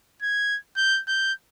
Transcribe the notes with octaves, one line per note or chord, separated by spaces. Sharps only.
G#6
G6
G6